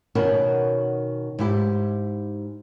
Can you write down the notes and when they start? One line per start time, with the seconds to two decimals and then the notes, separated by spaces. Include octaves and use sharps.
0.15 B2 D#3 C#4 F#4 A#4 B4
1.39 G#2 E4 G4